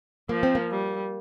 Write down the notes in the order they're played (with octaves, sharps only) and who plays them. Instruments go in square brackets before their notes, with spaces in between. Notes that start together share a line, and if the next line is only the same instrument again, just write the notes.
[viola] F3 [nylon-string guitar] A#3
[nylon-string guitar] C4
A#3
[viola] G3